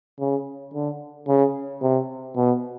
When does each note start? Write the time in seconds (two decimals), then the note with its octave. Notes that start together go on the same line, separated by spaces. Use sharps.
0.20 C#3
0.74 D3
1.28 C#3
1.82 C3
2.36 B2